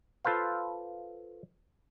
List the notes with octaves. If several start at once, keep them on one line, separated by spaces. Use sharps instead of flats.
F4 A4 B4 C5 F5